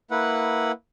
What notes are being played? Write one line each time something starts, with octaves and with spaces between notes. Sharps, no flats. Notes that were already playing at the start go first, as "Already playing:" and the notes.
A#3 E4 B4 F#5